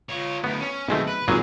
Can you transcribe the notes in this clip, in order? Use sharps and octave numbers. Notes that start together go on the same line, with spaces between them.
F4 C#5
D2 A2 B3
C#4
B1 D#3 G#3 A3 C4
B4
G#1 A#2 F#3 G#4 C5